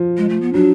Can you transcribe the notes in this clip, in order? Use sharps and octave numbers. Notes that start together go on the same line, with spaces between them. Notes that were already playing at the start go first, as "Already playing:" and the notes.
Already playing: F3
G#3
A3
B3
F#3 D4